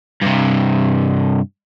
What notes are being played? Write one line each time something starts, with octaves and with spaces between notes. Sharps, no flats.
G2 C3